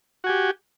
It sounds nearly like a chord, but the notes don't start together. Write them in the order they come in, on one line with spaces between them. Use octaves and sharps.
F#4 G#5 G4